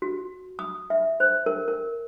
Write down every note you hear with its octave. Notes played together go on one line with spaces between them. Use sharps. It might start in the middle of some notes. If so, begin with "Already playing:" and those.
F#4
D#6
E5
C5
A#4
A#4